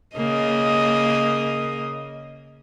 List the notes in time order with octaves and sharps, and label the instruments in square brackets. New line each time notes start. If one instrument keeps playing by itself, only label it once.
[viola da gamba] C#3 A#3 D#5